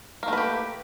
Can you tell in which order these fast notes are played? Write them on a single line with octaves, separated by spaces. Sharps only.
A#3 A3 B4 G4